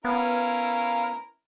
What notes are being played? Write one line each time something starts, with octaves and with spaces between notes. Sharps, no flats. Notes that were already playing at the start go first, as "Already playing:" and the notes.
B3 C#4 E4 A#4 F5